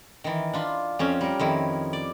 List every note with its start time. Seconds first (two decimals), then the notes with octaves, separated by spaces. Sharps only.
0.24 D#3 E3
0.53 D4 F4 B5
0.99 F2 C#4 F5 G5
1.21 G3 A#4
1.40 F2 D#3 E4
1.93 D5